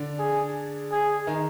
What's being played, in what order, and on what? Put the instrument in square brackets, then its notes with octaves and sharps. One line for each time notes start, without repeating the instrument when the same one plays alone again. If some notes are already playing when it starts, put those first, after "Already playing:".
Already playing: [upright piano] D3 D4
[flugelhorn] G#4
G#4
[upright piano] D#3 D#4